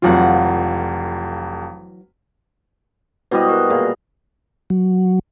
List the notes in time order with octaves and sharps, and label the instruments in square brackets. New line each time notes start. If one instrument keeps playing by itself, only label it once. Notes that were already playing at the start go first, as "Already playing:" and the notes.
[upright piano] F1 F2 F4 [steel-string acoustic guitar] E3 F#3 F#5
[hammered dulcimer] B2 G3 D#5 [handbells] E4 F#4 C5
[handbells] A#4 B4 C#6
[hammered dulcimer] A#2 [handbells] G#4 F5
[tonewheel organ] F#3